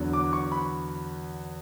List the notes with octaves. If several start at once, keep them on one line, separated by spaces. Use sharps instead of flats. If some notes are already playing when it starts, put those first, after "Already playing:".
Already playing: E2 D3 F#3 B3
D6
C#6
B5